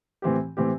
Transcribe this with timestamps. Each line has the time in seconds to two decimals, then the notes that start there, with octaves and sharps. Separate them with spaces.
0.22 A2 E3 C4 G4
0.57 A2 E3 C4 G4